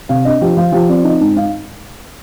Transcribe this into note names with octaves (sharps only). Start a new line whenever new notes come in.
C3 F5
D4 D#5
F3 G4
F3 F4
F3 G4
C4 D5
D#4 D#5
G#2
D#4 F5